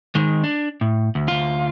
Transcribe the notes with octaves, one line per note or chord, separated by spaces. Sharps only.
D#3 G#3
D4
A2
D2
D2 F4